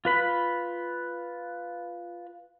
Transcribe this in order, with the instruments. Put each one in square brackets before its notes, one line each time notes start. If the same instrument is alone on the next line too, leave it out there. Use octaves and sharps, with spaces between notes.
[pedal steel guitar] F4 B4 B5